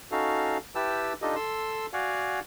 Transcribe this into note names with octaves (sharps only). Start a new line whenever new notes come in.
C#4 D#4 F#4 A4 F5
E4 G4 B4 G5 A5 E6
D4 D#4 F4 G4 A4 D#5
A4 C6 E6
F#4 D5 F5 F#5 G#5